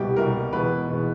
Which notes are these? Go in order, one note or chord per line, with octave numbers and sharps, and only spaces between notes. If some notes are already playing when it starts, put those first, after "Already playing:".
Already playing: C2 B2 G3 G4
C2 B2 G3 A#4
E2 B2 G#3 B4
E2 B2 G#3